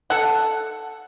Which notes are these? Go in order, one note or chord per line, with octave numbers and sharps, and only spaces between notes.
A4 F#5